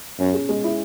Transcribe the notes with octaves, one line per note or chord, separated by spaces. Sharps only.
F#2 C#4
G#4
G#3
E4